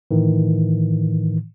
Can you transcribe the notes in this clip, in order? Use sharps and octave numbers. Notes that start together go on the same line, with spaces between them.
A2 D#3 E3